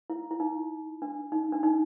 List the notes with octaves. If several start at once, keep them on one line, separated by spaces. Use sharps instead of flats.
E4
E4
D#4
D4
D#4
D4
D#4